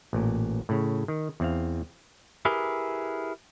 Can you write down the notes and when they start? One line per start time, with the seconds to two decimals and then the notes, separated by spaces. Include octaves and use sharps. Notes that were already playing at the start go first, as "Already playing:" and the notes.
0.13 A1 A#2
0.69 A2 C#3
1.08 D#3
1.40 E2 C4 F5
2.45 E4 G4 G#4 A#4 B4